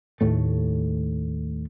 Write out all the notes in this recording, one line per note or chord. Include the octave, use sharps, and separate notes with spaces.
D#2 A2 A3